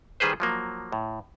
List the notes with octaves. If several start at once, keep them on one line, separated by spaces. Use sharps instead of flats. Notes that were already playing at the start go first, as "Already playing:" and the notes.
D#3 G3 G#4 B4 C5
F3 F#3 A#3
A2